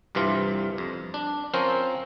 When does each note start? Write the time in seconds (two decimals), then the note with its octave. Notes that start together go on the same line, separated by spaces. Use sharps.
0.15 C2 G2 C3 E3 F4
0.78 F2
1.14 D4
1.54 F3 C4 C#4 A#4 C5